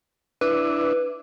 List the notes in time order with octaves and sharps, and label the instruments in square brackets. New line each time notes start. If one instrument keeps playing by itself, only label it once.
[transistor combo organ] D4 E4 [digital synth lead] B4